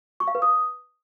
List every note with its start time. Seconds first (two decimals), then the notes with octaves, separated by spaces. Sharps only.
0.20 C#6
0.28 F5
0.35 B4
0.42 D#6